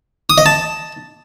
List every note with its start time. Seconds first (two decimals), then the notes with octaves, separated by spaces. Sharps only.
0.30 D#6
0.38 D#5
0.46 A5